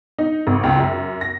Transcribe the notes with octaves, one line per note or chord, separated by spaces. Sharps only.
D#4
G#1
C#2
F#2
A#6